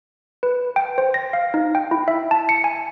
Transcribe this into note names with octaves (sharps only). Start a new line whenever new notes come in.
B4
G5
C5
A#6
F5
D#4
G5
E4
E5
A5
C#7
G#5